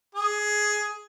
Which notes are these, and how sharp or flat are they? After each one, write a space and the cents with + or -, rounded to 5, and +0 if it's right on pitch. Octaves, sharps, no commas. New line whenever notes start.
G#4 +10